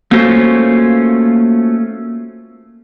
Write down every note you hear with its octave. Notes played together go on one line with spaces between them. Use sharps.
A3 A#3 C#4 F4 F#4 C5